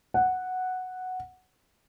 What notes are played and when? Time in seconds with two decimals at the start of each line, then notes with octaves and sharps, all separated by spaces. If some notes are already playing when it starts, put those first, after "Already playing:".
0.14 F#5